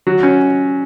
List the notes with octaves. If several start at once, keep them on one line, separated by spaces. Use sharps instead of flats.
F#3
C#4